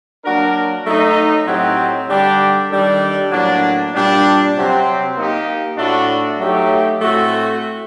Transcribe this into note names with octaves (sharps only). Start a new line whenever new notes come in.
F#3 A#3 D4 F#4 A#4
F#3 A3 D#4
A2 F#3 C4 D#4 G4
D3 G3 D4 G4
D#3 G3 D4 A4 D5
A2 F#3 A#3 D4
A#2 G3 D4
C3 F#3 C4 G4
A#3 D#4 G4
A2 A3 D4 F#4
F#3 A3 D#4 G4
A2 A3 C4 F#4